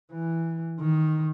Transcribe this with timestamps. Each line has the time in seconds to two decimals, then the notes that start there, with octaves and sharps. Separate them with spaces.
0.12 E3
0.80 D#3